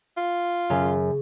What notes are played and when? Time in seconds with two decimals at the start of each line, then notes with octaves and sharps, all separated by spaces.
0.17 F4
0.70 F#2 C#3